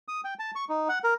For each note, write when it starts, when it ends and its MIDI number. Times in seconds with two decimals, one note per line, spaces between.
0.08 0.21 87
0.24 0.34 79
0.39 0.51 81
0.55 0.65 85
0.69 0.88 63
0.89 0.99 78
1.04 1.14 70